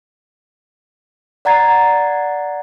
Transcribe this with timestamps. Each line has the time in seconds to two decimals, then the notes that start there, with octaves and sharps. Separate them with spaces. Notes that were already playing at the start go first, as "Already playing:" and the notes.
1.45 D5 F#5 A#5 G#6 A6 C7